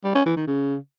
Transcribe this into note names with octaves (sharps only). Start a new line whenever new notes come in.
G3
C#4
E3
D#3
C#3